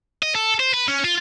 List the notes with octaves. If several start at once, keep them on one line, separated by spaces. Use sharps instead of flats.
D#5
A4
C5
B4
C#4
F4